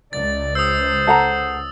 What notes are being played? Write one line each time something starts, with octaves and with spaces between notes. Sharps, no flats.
C#2 D5 A6
C5 D#6 E6
A4 F#5 A#5